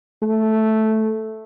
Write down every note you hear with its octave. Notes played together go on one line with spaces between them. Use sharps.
A3